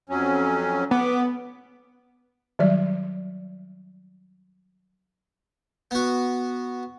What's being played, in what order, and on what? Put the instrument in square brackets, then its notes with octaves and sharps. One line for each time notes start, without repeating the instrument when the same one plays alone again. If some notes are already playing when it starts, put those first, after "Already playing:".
[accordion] F2 F#3 C#4
[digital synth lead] B3 [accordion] D6
[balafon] D#3 F#3 G3 D5
[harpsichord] B3 F#4